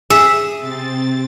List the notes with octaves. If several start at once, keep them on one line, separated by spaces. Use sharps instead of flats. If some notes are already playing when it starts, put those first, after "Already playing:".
G#4 E5
C3 C4 A6